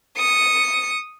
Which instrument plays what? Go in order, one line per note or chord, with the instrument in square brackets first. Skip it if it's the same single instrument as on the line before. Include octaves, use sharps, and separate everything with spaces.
[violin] D#6 C#7